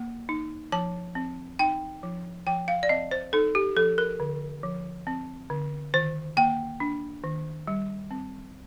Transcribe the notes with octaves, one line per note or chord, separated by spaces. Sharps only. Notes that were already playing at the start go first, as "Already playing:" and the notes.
Already playing: A#3
D#4
F3 A5
C4
D#4 G5
F3
F3 G5
F5
D5
C4 D#5
C5
D#4 A4
G4
F3 A4
A#4
D3
F3
C4
D3
D#3 C5
A#3 G5
D4
D#3
G3
C4